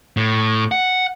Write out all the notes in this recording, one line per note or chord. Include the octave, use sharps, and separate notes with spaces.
A2
F#5